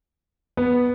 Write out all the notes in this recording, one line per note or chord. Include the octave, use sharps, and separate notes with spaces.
B3